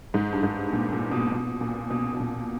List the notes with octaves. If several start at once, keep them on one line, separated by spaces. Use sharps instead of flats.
G#2
G2
G#2
A#2
A#2
B2
B2
A#2
B2
B2
A#2